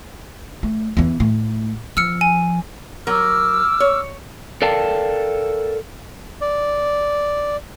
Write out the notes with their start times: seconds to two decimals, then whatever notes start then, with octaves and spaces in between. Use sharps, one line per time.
0.63 A3
0.97 E2 E3
1.20 A2 A3
1.97 F3 E6 F6 C#7
2.21 G#5
3.07 F#3 A#4 D6 E6 F6
3.80 C#5
4.62 A4 A#4 D5 F5 G5 A5
6.41 D5